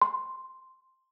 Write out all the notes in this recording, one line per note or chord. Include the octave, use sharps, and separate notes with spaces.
C6